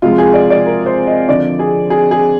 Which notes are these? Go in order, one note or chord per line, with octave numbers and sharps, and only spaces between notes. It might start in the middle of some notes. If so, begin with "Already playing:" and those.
C3 F3 G#3 F4
G#4
D5
D5
A#4
C5
D#5
F2 D3 F3 D5
G#4
G#4
G#4